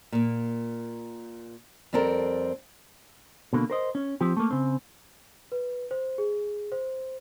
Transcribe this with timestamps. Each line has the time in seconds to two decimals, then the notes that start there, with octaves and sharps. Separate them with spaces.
0.12 A#2 A#3
1.93 F2 G3 C4 A4 A#4
3.53 B2 D3 A#3
3.70 A#4 C5 D#5
3.95 C#4
4.21 F3 C4 G4
4.37 A3 A#3
4.51 C#3 C4
5.52 B4
5.91 C5
6.18 G#4
6.72 C5